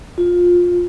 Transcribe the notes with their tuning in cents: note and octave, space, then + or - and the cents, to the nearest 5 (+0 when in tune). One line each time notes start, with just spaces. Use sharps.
F4 +15